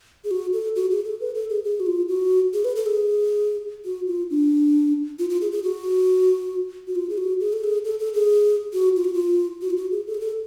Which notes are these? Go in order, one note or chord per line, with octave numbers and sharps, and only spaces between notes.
G#4
F#4
A4
F#4
G#4
A4
B4
A4
G#4
G#4
F#4
F4
F#4
G#4
B4
A4
G#4
F#4
F4
D4
F4
F4
G#4
G#4
F#4
F#4
F4
G#4
F#4
G#4
A4
G#4
A4
A4
G#4
F#4
F4
F#4
F4
F#4
F4
F#4
G#4
A4
G#4
A4